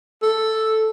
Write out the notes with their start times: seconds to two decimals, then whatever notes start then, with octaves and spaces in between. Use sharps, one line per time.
0.22 A4